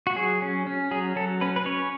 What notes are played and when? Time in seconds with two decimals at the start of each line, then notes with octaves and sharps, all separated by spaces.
0.07 F#4
0.16 F#3 G#4
0.42 C#4
0.67 C#4
0.91 F#3 G#4
1.16 F#3 A4
1.41 C#4 B4
1.56 B4
1.66 C#4 C#5